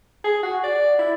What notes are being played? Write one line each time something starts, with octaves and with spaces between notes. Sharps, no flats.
G#4
F#4
D5
E4